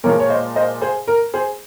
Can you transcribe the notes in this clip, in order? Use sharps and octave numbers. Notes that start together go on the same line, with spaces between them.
A#2 F3 G#3 A#4 C#5
C#5
C5 D#5
C5 D#5
G#4 C5
A#4
G#4 C5